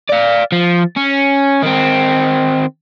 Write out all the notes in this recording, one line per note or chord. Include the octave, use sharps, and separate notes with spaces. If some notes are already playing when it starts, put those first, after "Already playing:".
D5 F5
F3
C#4
D#3 C4